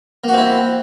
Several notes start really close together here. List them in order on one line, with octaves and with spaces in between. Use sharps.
A#3 F#4 C4 E4